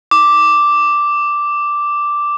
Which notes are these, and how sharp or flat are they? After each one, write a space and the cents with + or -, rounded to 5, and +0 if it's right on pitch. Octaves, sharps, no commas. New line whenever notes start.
D6 +0